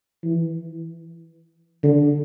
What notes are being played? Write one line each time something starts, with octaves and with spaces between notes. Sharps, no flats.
E3
D3